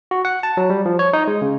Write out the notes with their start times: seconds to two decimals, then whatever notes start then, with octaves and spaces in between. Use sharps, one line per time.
0.11 F#4
0.25 F#5
0.43 A5
0.57 F#3
0.70 G3
0.86 F3
0.99 C#5
1.13 D#4
1.27 G#3
1.42 C#3